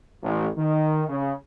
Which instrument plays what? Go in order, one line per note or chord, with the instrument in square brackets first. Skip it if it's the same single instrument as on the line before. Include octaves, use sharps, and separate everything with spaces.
[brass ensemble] A1
D#3
C#3